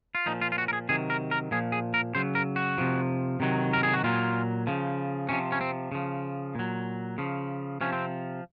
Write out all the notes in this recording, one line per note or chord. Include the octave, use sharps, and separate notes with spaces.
F4
A#2 F3 D#4
F4
F4
F#4
A#4
G#4
C3 D#3 F#3 G#4
A#4
A#4
A#2 F3 G#4
G#4
A#4
C#3 F#3 C5
A#4
F#4
C3 F3
C3 D#3 F#3
A#4
G#4
F#4
A#2 F#3 F4
C#3 F3
C3 F3 C#4
C#4
C4
C#3 F3
A#2 F#3
C#3 F3
C3 F3 C#4
C4